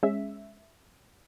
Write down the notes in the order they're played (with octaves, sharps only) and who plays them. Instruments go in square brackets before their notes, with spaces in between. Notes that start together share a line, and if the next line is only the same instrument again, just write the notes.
[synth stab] G#3 C#4 E5